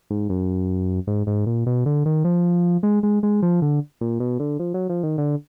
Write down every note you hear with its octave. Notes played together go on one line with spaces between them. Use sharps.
G#2
F#2
G#2
G#2
A#2
B2
D3
D#3
F3
G#3
G#3
G#3
F3
D3
A#2
B2
D3
F3
F#3
F3
D#3
D3